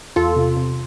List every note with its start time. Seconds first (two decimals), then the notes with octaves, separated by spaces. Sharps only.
0.16 E2 F4 A4
0.36 C3
0.57 C3